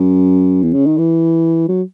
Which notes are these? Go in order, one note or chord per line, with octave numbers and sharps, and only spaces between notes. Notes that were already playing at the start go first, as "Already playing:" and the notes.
Already playing: F#2
E2
C#3
D#3
E3
F#3